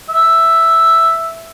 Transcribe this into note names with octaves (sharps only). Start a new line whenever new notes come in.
E5